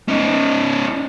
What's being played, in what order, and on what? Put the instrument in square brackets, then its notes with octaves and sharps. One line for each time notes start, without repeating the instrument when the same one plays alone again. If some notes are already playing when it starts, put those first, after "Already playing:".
[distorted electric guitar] C#4 D#4